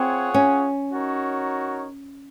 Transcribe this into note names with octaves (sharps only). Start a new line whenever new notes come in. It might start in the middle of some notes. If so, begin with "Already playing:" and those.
Already playing: C4 F4 G#4 C#5 F#5
C#4
D#4 F#4 A#4 C#5